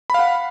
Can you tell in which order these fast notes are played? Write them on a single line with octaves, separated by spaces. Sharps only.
B5 F5 F#5